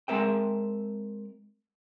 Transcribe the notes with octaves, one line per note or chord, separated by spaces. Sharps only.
G#3 C4 A#4 E5 G5